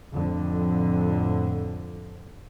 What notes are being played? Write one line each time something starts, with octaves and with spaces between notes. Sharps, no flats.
F2 A2 D3